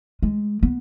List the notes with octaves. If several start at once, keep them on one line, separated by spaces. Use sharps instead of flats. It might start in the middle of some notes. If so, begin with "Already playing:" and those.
G#3
B3